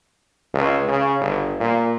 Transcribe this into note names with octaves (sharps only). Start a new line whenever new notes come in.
C#2
C#3
G1
A#2